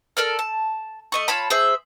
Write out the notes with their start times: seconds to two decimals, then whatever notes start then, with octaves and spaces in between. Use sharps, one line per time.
0.17 A4 A#4 D5 F6
0.39 A5
1.12 A3 D#5 C#6
1.28 F4 C#5 A5 B5
1.50 G#4 C5 E5